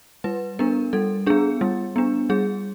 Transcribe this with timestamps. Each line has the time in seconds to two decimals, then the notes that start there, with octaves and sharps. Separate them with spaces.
0.24 G3 B4
0.59 B3 D4 A#4
0.93 G3 A4
1.26 B3 D4 G#4
1.61 G3
1.96 B3 D4
2.30 G3 G#4